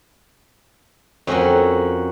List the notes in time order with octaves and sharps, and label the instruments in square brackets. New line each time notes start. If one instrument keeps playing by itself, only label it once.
[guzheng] F2 C#4 F#4 A#4